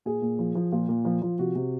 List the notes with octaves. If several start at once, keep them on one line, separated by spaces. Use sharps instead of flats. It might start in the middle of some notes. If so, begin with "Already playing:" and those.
A#2 G#4
A#2
F3
F3
A#2 F4
A#2
F3
F3
C3 F#4
C3